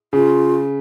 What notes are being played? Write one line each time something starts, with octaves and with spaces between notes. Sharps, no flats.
C#3 F4